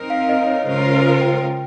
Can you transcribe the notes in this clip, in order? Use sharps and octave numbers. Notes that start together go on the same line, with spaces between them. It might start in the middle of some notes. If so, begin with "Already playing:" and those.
Already playing: C4 D#4 A#4
F5
F5
D#5
C#5
C#3 G#3 C#4 F4 A#4 C5
C5
C5
G5